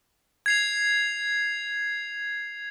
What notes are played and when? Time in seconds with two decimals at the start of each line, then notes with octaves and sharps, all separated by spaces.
0.46 G#6 C7 F7